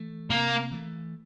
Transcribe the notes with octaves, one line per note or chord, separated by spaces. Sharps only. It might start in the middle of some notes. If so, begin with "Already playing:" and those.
Already playing: E3 A3
C3 A#3
E3 A3